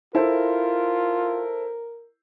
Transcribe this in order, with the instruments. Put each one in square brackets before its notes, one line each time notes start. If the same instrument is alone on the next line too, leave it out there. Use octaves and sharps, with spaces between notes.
[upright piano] E4 A4 C5 [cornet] F4 [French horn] A#4